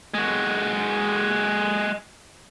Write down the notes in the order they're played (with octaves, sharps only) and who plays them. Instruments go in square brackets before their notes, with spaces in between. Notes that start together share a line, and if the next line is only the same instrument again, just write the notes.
[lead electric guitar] G#3 F#4